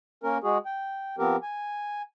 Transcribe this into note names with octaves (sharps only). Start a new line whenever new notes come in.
A#3 C#4 A#4
G#3 F#4 G#4
G5
F3 B3 C4 G4 A#4
G#5